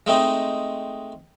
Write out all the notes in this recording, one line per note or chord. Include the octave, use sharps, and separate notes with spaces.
G#3 A3 C4 D#4